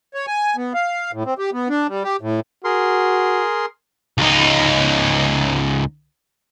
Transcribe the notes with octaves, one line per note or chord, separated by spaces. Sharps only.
C#5
G#5
B3
F5
A2
C4
G4
B3
D4
G3
G4
A2
F#4 G#4 A#4 C6
C#2 D#4